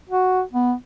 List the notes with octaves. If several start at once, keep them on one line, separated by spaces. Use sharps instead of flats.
F#4
B3